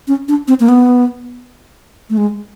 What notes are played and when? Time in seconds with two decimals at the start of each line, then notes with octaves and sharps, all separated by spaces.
0.08 C#4
0.28 D4
0.48 C4
0.60 A#3
0.69 B3
2.10 A3
2.17 G#3